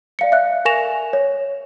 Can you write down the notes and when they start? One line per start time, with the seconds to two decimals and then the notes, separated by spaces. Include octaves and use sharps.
0.19 D5 F5 C#7
0.32 E5 F5 F#6
0.65 A#4 G#5 C#6 A#6 E7 F7
1.13 C#5